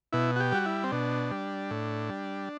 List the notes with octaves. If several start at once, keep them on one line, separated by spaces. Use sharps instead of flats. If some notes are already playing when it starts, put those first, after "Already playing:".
B2 E4
F#4
G4
G3 F#4
E4
C4
B2 D4
G3
A2
G3